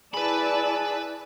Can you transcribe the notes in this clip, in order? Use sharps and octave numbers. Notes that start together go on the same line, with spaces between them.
E4 G#4 B4 D5 A5 B5